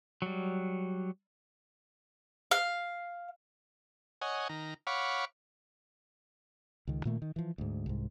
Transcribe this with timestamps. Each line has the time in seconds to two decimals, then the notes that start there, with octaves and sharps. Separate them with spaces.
0.22 F#3 G3
2.51 F5
4.21 C#5 D#5 F#5 G#5
4.49 D#3 A#5
4.87 C#5 F5 F#5 B5 C#6 D6
6.87 C#2 D#3
7.05 A#2 D#3 A3 A#3
7.22 D#3
7.36 E3 F3
7.58 D2 G#2
7.86 C2 G#2